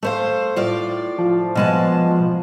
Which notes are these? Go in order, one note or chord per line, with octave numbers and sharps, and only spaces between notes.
A3 C5 F5
A2 F4 D5
F3
B2 G#3 A5